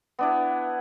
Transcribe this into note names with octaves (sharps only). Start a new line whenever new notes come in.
B3 D4 E4